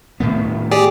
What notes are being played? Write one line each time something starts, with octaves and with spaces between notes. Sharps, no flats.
A2 D#3 B3
G4 G#4 D5